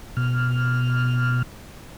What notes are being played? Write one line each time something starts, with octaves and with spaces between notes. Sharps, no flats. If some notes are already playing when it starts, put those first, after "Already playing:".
B2 F6